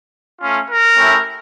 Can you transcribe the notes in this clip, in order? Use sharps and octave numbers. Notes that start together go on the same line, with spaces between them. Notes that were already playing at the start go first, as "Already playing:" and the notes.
A3 C#4 F4
A#4
A3 C#4 E4 G4